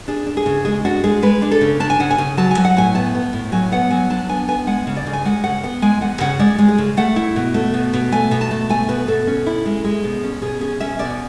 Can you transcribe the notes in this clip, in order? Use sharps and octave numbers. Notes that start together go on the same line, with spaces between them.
D4 G#4
D4
G#4
C#3
G#3 G#4
D4 F#4
G#3 G#4
G#3 B4
D4
A4
C#3
D4 A5
G#5
C#3 F#5
G#5
C#3
F#3 A5
G#5
F#3
F#5
A2 G#5
B3 A5
B3
A2
F#3 G#5
B3 F#5
F#3 G#5
D4 A5
B3 G#5
B3 G#5
G#3 F#5
C#3
D5
C#3
G#5
G#3 F#5
C#3 F#5
B3 F#5
G#3 G#5
E2 F#5
C#3 F#5
G#3 D5
G#3
G#4
C#3
A3 F#5
E4
B2
A3
B2
B2
A3 G#5
B2
A5
A3
A3 G#5
B2 B4
B2 A4
C#4
E4
G#3
G#3
B2
C#4
B2 G#4
C#4 G#4
C#4 E5
B2 D5